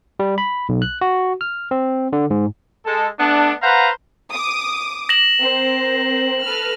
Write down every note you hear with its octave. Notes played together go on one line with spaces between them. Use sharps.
G3
B5
B1
F#6
F#4
F6
C4
D3
G#2
G#3 A4
A3 B3 D4
B4 C5 F5 F#5 A#5
D6 D#6
A#6 E7 F#7
C4 A#4 C5
A4 B4 F6